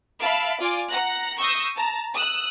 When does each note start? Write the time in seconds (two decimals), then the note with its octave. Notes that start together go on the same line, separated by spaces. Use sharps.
0.21 E5 F5 A5 B5 D7
0.60 F4 D5 G#5 D6
0.89 F#5 A#5 F#6 A#6
1.39 C#6 D#6 E6 G6 A#6 C7
1.76 A5 A#5
2.14 D#6 E6 F#6